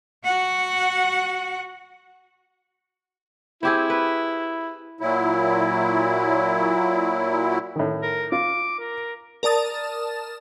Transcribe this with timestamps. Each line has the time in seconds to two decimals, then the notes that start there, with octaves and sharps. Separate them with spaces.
0.24 F#4 F#5
3.63 C4 E4 G4 G#4
3.90 B4
5.01 A#2 F#3 E4
7.76 A2 D#3
8.03 A#4
8.32 F4 D6
8.79 A#4
9.43 A#4 D5 A5 D#6 A6